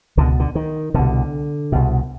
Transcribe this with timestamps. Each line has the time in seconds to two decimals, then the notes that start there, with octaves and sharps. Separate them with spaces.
0.17 C#2 B2 D3
0.40 D3
0.55 D#3
0.94 C2 B2 D3
1.72 C2 B2